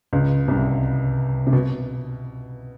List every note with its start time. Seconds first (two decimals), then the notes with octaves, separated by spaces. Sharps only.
0.13 C#2 C#3
0.48 C2 C3
1.47 C3
1.53 B2